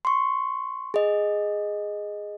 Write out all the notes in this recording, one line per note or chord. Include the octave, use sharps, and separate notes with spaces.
C6 C#6
G#4 D#5